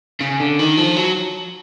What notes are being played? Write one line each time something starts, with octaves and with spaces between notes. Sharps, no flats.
C#3
D3
D#3
F3
F#3